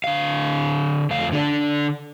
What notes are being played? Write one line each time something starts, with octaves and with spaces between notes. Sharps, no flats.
D3 F5
F2 A3 F5
D3 D4